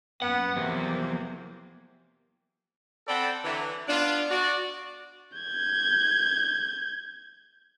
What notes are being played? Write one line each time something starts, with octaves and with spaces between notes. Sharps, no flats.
F#2 A#2 B3 F#5
E2 C3 F3 F#3 A#3
C4 A4 D5 F#5 G5 B5
D3 E3 F#3
B3 D4 F4
F#4 D5
G6 G#6